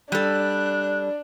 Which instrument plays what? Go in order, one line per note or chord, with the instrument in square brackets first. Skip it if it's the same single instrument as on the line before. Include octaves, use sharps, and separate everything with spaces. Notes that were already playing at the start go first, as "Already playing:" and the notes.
[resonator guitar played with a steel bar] G3 A4 [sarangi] D4 [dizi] F#6